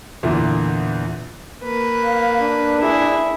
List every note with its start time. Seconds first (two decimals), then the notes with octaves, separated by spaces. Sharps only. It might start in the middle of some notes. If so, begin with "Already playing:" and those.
0.23 E2 A#2 D3 E3
1.63 A#3 B4
2.04 F5
2.39 D4
2.80 E4 G#4